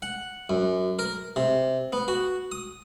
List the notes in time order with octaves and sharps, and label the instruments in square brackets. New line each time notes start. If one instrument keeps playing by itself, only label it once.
[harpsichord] F#5
F#2
A#4
C3
B3
F#4
D#6